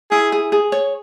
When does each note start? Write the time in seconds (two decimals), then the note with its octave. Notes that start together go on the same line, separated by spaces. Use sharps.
0.11 E4 G#4
0.32 G#4
0.52 G#4
0.72 C#5